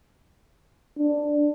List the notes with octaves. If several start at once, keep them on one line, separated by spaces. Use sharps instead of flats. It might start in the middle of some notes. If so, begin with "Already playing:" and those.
D4